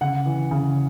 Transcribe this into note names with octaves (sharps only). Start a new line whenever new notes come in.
C#3 F#5
E3
C#3